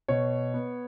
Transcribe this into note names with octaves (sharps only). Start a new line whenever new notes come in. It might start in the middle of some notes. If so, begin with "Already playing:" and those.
B2 C#5
B3